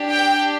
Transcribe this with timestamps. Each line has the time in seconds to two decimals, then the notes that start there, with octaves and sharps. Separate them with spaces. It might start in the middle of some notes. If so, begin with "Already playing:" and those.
Already playing: D4 G4
0.10 G5